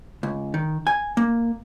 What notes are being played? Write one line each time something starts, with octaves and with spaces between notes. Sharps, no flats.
C#2
D#3
G#5
A#3